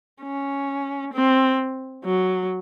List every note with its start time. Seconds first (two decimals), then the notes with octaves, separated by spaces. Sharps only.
0.22 C#4
1.13 C4
2.05 F#3